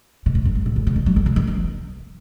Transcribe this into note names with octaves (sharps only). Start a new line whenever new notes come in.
B2
A2
F#2
G#2
A2
C#3
C#3
D#3
F#3
D#3
C#3
D#3
E3